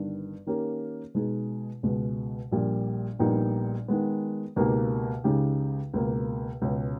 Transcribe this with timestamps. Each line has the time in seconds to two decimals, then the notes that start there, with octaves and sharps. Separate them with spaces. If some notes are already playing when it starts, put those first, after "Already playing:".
Already playing: G1 G2 D#3
0.47 D#3 A#3 C#4 G4 A#4
1.14 B2 G#3 D#4 G#4
1.83 C#2 B2 G#3
2.52 A#1 A#2 G3
3.19 A#1 A#2 G3 B3 D#4
3.88 D#3 G#3 B3
4.56 C#2 B2 A#3 D#4 G4
5.24 C#2 C#3 G#3 D#4 G4
5.93 C#2 B2 A#3
6.62 C#2 B2 G#3 C#4